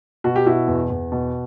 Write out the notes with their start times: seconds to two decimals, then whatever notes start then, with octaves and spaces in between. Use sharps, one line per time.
0.24 B2 F#4
0.36 G4
0.46 B2 E4 F#4
0.68 E2
0.90 E2
1.12 B2